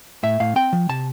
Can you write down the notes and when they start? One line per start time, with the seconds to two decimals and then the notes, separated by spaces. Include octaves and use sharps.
0.23 A2 E5
0.40 A2 F5
0.56 C4 G5
0.73 F3
0.89 C3 A5